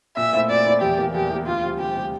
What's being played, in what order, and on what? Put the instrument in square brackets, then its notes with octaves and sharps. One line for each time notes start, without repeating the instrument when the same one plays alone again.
[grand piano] A#2 [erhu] E5
[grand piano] A3 C4 E4
[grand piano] A#2 [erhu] D5
[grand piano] A3 C4 E4
[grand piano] E2 [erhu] G4
[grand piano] E3 A#3
[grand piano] E2 [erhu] G4
[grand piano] E3 A#3
[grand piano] D2 [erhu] F4
[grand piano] C3 G3
[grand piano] D2 [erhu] G4
[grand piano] C3 G3